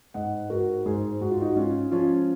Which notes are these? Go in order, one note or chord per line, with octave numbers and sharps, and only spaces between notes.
G#2 D#5 F#5
G#2 F#4 A#4
G#2 G#4 C5
G#2 F#4
F4
D#4 F#4
G#3 C#4 F4
F3 C#4 F4